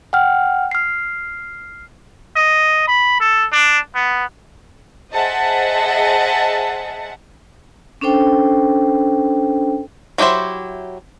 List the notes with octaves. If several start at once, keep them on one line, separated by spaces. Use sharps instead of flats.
F#5 G5 F6
F6 C7
D#5
B5
A4
D4
B3
G#4 C5 D#5 E5 F#5 A5
C#4 D4 A4 C5 G5
F#3 E4 G4 C5 E5